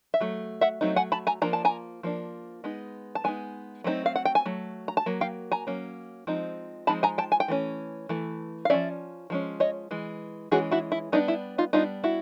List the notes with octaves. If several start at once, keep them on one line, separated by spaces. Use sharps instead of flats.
E5
F#3 A3
E5 F#5
F#3 A3 C4 D#4
F#5 G#5
A5 B5
G#5 A#5
F3 A#3 D4 A#5
A5
G#5 A#5
F3 A#3 D4
G#3 B3 D#4
A5
G#3 B3 D#4 G#5
F#3 A3 C4 D#4
F5
F#5
G5
G#5
F#3 A3
A#5
A5
F#3 A#3
F5 G5
G#5 A#5
F#3 A#3 C#4
F3 G#3 C4 D#4
F3 G#3 C4 D#4 A5 B5
G#5 A#5
G5 A5
G#5
G5
E3 A3 C#4
E3 A3
F5
F3 G#3 C#4 D5 E5
F3 G#3 C#4
C#5 D#5
E3 G#3
E3 G#3 C#4 F#4 G#4
E4 F#4
E4
G3 B3 D4 D#4
E4
D#4 F4
G3 B3 D4 D#4 F4
E4 F#4